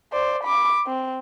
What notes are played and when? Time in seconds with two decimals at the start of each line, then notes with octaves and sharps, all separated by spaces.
0.13 C5 D5
0.44 B5 D6
0.87 C4